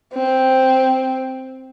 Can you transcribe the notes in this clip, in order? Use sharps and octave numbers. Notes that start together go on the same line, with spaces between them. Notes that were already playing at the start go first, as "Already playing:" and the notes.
C4